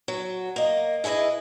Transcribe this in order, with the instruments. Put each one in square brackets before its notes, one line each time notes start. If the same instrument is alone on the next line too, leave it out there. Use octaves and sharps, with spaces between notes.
[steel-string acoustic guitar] F#3
A#3 D#5
E4 G#4 B4 D5 D#5